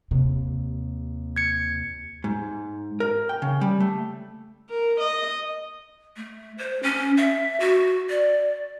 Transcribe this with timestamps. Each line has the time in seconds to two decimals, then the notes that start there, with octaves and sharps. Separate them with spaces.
0.11 D#2 C3
1.36 G#6 C#7
2.24 G#2
3.00 A#4
3.29 G5
3.42 C#3
3.61 G3
3.80 A3
4.70 A#4
5.00 D#5
6.17 A3
6.58 C5
6.83 C#4
7.17 E5
7.60 F#4
8.10 D5